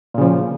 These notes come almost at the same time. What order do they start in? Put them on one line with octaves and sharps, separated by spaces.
A#2 C#3 F3